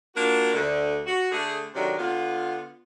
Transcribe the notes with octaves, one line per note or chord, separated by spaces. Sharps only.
A#3 D4 F4 F#4 A#4
D2 D3
F#4
D3 A3 G#4
C3 D#3 F#3 A3 D4
D3 B3 F4